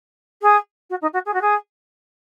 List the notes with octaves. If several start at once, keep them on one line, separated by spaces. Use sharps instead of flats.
G#4
F#4
D#4
F#4
G#4
F#4
G#4